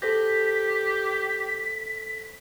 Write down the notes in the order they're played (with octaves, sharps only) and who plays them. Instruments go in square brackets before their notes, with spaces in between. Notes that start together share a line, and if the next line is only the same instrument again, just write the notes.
[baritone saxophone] G4 [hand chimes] A4 C5 A#6 [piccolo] B6